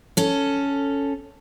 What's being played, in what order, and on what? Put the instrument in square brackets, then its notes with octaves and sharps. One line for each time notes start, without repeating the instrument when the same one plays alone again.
[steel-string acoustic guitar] C#4 A4